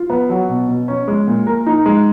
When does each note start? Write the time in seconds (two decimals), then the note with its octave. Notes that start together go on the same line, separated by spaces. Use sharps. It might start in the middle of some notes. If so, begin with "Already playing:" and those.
Already playing: F4
0.10 B3
0.30 F#3
0.49 B2
0.68 B2
0.88 C#4
1.08 G#3
1.27 A#2
1.47 A#4
1.66 D#4
1.86 G#3